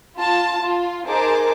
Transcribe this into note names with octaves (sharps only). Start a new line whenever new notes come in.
F4 A5
F4
D#4 G#4 A#4 C5 A5 D6